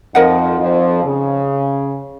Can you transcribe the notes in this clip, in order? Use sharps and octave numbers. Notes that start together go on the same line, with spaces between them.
F2 F3 D#4 A#4 D#5 F#5
F2 F3
C#3